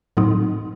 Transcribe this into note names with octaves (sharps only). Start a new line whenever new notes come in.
A2 F#3 C4 D#4